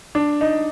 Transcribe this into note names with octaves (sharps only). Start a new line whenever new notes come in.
D4
D#4